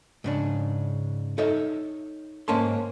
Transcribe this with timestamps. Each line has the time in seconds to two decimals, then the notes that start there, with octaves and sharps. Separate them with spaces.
0.24 G#2 C#3 D4
1.38 D#4 A4 C#5 D#5 E5
2.48 G#2 A#3 C#4 A5 C6